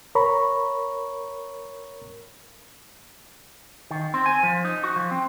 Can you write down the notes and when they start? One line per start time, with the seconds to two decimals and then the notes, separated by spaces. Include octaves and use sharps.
0.15 A#4 C#5 A#5 B5 C#6
3.91 D#3
4.14 C4
4.26 G#5
4.43 F3
4.65 D#4
4.84 F#4
4.96 F3
5.11 C4